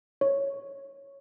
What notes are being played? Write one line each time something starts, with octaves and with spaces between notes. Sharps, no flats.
C#5